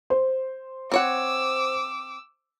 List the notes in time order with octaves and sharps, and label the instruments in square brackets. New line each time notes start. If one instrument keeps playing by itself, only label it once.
[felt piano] C5
[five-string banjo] C4 C#5 F#5 [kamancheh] D6 E6